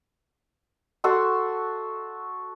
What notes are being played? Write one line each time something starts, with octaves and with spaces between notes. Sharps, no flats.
F#4 A4 E5 C6